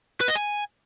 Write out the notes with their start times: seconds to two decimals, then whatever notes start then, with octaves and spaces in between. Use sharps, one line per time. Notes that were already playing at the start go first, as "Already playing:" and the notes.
0.21 B4
0.28 D#5
0.36 G#5